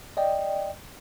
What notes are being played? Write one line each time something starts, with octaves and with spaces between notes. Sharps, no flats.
D5 D#5 G5